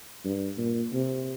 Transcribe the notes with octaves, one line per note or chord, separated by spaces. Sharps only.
G2
A#2
C3